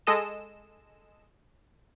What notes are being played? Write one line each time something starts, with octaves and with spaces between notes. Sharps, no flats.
G#3 A4 D#5 E7